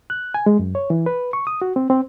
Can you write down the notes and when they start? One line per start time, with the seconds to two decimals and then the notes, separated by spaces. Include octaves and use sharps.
0.10 F#6
0.34 G#5
0.46 G#3
0.59 F#2
0.75 C#5
0.90 E3
1.06 B4
1.33 C#6
1.47 D#6
1.62 F#4
1.76 C4
1.90 C4